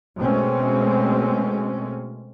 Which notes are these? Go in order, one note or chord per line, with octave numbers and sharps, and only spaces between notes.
B2 G#3 A3 C4 C#4